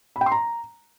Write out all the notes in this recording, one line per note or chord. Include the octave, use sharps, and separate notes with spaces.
B5
G5
C6
A#5